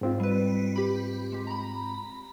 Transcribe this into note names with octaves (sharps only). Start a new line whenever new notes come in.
G#2 C4 F4
G3 B4
G4 B5
G#3 G4
A#5 B5